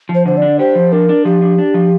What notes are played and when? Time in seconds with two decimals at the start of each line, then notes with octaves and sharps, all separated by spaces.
0.09 F3
0.15 C5
0.26 D3 C5
0.37 D4 D5
0.59 G4 C5
0.75 F3
0.92 D4 A#4
1.09 D4
1.25 F3 G4
1.42 D4
1.58 D4
1.74 F3